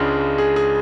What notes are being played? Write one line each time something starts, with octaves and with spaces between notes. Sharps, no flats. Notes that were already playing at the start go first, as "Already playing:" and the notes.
Already playing: C#2 C#3 G#3 D4 G#4
G#4
G#4